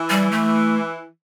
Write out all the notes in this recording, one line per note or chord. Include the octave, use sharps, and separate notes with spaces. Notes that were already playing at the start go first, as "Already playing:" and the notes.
Already playing: E3
G3
A3